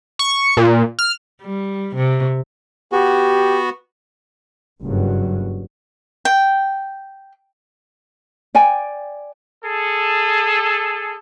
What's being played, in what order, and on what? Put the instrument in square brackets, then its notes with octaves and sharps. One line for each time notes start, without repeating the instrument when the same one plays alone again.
[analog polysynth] C#6
A#2
F6
[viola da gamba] G3
C3
[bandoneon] B3 F#4 [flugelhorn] G4
[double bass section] F#1 G2 F#3
[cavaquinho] G5
[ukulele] D5 G5 G#5
[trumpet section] G#4 A4